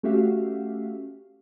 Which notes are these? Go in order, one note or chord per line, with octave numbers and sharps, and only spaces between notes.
A3 C#4 F#4 G4 E5 F5